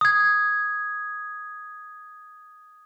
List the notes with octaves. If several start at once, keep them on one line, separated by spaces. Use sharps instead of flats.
D#6 G#6